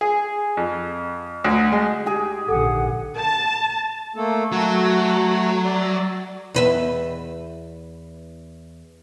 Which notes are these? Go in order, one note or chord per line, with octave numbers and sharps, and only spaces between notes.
G#4
F2
D2
G#3
G4 G#4
A#1 G#2 D3 A4 F#5
A5
A3 A#3 A4
F#3 A3 F#4
D5
E2 B4 E5